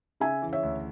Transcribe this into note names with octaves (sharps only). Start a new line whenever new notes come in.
C#3 E5 G#5
E3
C#5 E5
D2